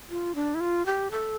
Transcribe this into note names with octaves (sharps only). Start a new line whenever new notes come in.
F4
D4
E4
F4
G4
A4